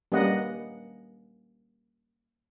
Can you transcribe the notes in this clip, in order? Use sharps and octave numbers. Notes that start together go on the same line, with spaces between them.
G3 A#3 C#4 B4 D#5 F#5